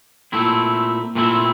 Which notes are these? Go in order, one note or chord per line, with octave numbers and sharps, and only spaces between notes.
A#2 A3 C4 E4
A#2 A3 C4 E4